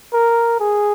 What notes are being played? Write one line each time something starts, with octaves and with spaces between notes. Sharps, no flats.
A#4
G#4